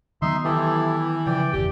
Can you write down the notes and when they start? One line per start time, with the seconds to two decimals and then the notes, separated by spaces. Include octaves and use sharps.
0.22 D#3 F#3 B3 D#4 E5 C6
0.45 E3 E4 G4 A4
1.26 C#3 F3 D5 G5
1.53 G1 E2 A#2 G4